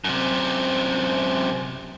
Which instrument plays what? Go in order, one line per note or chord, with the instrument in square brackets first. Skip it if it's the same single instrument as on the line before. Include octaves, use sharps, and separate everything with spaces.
[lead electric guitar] F#2 C3